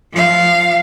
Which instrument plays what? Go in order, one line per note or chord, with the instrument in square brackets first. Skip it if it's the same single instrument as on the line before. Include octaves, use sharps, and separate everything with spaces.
[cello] F3 F5